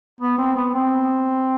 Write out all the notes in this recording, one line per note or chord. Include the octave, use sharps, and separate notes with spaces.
B3
C4
B3
C4